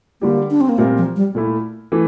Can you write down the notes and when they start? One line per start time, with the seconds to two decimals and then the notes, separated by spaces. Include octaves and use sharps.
0.21 D3 G3 A#3 D4 G4
0.51 D4
0.61 C4
0.69 A#3
0.78 A#2 G3 A3 C4 F4 A#4
0.97 F3
1.16 G3
1.35 A#2 A3 E4
1.92 E3 A3